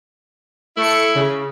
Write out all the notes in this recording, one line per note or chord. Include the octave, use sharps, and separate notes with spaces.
A3 E4 C#7
C#3